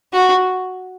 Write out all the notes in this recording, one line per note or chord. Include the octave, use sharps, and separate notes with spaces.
F#4